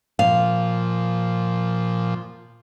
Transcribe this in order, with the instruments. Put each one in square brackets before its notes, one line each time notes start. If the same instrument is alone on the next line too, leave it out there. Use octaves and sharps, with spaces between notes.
[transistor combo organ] A#2 F3 [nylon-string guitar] F5